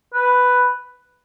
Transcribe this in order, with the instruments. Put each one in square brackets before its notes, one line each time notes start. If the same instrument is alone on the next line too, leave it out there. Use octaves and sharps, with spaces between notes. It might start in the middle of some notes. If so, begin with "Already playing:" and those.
[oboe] B4